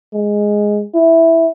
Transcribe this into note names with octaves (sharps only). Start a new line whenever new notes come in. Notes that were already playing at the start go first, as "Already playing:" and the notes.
G#3
E4